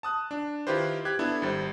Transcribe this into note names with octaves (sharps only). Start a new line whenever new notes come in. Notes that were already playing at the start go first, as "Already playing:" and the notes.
A5 D#6 F#6
D4
D#3 E4 F4 G4 B4 C5
G4 F#6 G#6
B3 D4 E4 A4
G#1 G3 C5